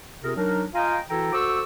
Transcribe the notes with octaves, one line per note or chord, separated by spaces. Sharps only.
C3 C4 F4 G#4 A#4
F#3 D4 D#4 A#4
F4 D#5 F5 G5 G#5 A#5
E3 E4 F#4 A4 G5 A#5
F#4 A4 C5 C#6 D6 E6